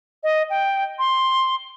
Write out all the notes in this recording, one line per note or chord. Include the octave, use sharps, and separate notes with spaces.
D#5
G5
C6